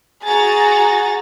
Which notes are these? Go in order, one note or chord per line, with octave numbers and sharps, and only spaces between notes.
F#4 G#4 A#5 A6